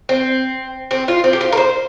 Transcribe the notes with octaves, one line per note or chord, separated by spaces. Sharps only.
C4
C4
F4
C4
G4
F4
A#4
C5